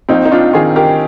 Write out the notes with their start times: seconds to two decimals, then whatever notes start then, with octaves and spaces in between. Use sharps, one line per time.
0.09 A#1 C4 D#4
0.25 D#4
0.32 D4 F4
0.53 D#3 F4 G#4
0.76 G4 A#4